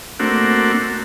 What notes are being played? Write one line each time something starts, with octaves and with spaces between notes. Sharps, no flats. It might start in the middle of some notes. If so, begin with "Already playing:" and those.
A3 A#3 C4 D4 F#4